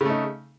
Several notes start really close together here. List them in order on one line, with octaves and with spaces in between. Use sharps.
C#3 A3 D#4